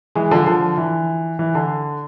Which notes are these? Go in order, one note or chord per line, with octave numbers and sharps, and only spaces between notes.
E3 G#3
D3 F3
D3 F3
E3
E3
D3